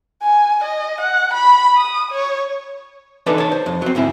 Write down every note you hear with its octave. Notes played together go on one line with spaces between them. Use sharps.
G#5
D#5
F#5
B5
D#6
C#5
E3 D4 D#4 A4 B4 D5
C#5 A5
C5
F2
F#3 C4
D2 G#2 C4 E4